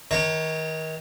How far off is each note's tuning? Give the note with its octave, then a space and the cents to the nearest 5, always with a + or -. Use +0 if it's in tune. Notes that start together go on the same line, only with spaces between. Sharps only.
D#3 +35 C#5 +0 A#5 -35